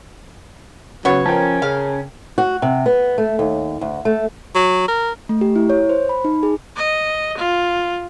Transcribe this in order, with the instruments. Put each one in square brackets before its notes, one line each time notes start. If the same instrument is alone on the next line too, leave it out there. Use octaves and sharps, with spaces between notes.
[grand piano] C#3 [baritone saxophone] F#3 [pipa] B3 C#5
[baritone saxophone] F3 [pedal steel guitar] C#4 [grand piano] A#4 G5 A5
[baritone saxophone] C#3 [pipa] F5
[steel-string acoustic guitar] F#4
C3
B3
A3
D#2
D2
A3
[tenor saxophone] F#3
A#4
[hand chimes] A3
G4
E4
C#5
C5
B5
D#4
G#4
[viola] D#5
F4